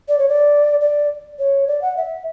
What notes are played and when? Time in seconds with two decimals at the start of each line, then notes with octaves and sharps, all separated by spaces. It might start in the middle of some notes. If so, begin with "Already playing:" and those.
0.08 D5
0.18 C#5
0.29 D5
0.81 D5
1.39 C#5
1.67 D5
1.82 F#5
1.97 E5